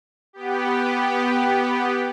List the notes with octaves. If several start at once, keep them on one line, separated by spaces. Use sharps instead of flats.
B3 G4